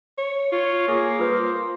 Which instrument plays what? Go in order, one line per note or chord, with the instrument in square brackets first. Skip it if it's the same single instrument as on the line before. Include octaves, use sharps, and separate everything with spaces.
[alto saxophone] C#5
[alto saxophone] F4 [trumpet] C#5
[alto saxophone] A#3 [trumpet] G#4
[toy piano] F4 B4 D#6 [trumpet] C5